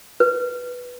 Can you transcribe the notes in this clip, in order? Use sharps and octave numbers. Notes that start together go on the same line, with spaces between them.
B4